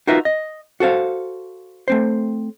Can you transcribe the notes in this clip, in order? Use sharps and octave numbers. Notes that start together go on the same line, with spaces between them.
D#4 F4 F#4 A#4 B4 E5
D#5
F#4 A4 C5 F5
A3 C4 C5